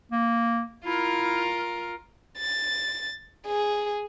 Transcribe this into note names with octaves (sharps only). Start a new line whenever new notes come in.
A#3
E4 F4 A#4
A6
G#4